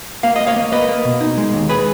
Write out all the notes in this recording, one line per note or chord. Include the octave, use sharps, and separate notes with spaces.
A#3 F5
A#3 D#5
C#5 F5
A#3
A#3 B4 D#5
A#3
B2
D#4
G#3
D#2
G#4 B4